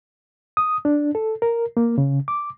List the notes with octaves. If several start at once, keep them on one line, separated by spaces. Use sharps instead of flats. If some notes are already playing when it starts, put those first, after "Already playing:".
D#6
D4
A4
A#4
A#3
C#3
D6